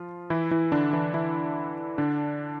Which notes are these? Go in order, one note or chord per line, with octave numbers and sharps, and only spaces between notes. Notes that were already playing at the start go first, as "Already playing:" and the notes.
Already playing: F3 F4
E3 E4
E3 E4
D3 D4
E3 E4
E3 E4
D3 D4